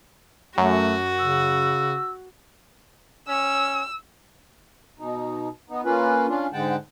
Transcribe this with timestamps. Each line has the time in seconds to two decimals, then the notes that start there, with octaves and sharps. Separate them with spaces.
0.58 F#2 A3 F#4
1.19 C#3 E6
3.28 C#4 E6
5.00 B2 D#4
5.70 B3 D#4
5.85 A#3 C#4 F4 B4
6.28 C#4 D4 F4
6.53 G#2 D3 G#3 F#5 G5 A5